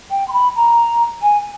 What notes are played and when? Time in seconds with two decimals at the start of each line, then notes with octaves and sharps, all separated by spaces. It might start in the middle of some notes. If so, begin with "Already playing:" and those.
0.10 G5
0.28 C6
0.32 B5
0.55 A#5
1.21 G#5